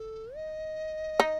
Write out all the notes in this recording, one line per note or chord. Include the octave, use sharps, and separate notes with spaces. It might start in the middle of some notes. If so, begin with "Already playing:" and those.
Already playing: A4
D#5
D#4